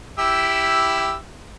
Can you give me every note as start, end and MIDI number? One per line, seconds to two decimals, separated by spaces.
0.19 1.16 64
0.19 1.16 67
0.19 1.16 88